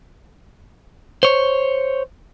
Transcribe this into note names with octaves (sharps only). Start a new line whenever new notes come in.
C5 C#5